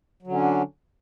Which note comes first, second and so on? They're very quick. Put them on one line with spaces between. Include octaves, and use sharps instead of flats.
F#3 D3 C#4 D4